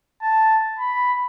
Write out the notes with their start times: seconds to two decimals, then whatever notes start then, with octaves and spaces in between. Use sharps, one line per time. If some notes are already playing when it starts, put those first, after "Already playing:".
0.22 A5
0.79 B5